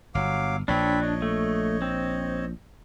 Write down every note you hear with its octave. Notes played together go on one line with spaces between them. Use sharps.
G1 F#3 F5 D6
A#1 A#2 C4 D4 C#5 B5
C#5 D#5
A3
C4